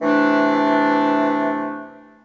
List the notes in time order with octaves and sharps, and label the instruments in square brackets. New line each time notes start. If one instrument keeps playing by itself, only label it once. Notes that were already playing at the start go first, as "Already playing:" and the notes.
[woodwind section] C3 E3 A3 D4